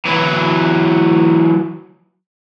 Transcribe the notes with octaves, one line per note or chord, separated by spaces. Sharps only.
E3 F#3